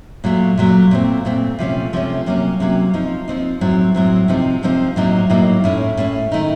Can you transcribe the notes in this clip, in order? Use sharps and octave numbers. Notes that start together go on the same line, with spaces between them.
A#2 F#3 A3
A#2 F#3 A3
A#2 A3 C4
A#2 A3 C4
C3 F3 A3 C#4
C3 F3 A3 C#4
C3 F#3 A#3 C#4
C3 F#3 A#3 C#4
F3 C4 D#4
F3 C4 D#4
A2 F#3 C4
A2 F#3 C4
C3 F3 C4 D#4
C3 F3 C4 D#4
A2 F#3 A#3 D#4
A2 F#3 A#3 D#4
A2 A3 C#4
A2 A3 C#4
D#3 A3 D#4